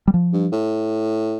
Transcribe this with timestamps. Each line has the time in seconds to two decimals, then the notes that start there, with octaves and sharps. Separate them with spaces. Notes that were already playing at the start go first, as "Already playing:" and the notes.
0.08 G3
0.14 F3
0.33 G2
0.52 A2